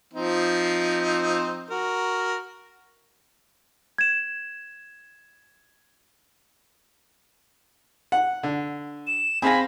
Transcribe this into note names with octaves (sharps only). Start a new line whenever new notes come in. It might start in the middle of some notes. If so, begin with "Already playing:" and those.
F3 C4 D#4
F#4 A#4
G#6 E7
F#5
D3
E7
C4 G#4 F5 G#5 B5 A#6